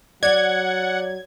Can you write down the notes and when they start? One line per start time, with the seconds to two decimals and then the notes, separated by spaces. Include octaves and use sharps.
0.23 F#3 D5 F#5 G#6